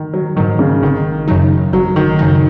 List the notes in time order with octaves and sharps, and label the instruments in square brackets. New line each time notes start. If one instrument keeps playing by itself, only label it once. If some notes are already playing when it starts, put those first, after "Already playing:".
Already playing: [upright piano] D#3
F#3
[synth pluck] G#2 F#3 [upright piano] D#3
[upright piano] C#3
[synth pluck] G#1 [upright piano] D#3
[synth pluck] F#2 C#3 F#3 D#4
[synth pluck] G#1 [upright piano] F#3
[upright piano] D#3
[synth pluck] F#2 C#3 F#3 D#4